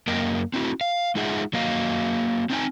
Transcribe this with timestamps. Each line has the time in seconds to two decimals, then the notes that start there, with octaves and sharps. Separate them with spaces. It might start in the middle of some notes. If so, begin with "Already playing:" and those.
0.07 F#2 A#3 A#4 D#5 G5
0.54 C4 E4 F#4
0.81 F5
1.15 G#3 D#4 F4 G#4 E5 F#5
1.53 F#3 A#3 D#5 F5
2.50 C4 D4 D#4 B4 G5 G#5